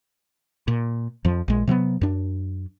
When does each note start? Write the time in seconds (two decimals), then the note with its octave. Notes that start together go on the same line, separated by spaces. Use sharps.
0.68 A#2
1.25 F2 F3
1.48 A#1 G#3
1.67 C3 F#3 A#3 B3
2.01 F#2 D4